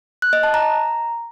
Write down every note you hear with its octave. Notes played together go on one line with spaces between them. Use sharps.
F#6
D#5
A5
A#5